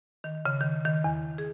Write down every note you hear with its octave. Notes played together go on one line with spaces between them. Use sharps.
D#3
C#3
D#3
D#3
E2
G#4